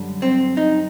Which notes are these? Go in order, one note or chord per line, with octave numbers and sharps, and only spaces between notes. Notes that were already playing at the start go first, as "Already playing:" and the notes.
Already playing: F#2 D3 G3
C4
D#4